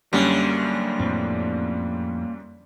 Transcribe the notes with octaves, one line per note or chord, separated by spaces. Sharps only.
F#2 D3 G3 A#3 C#4
F2 A2 C4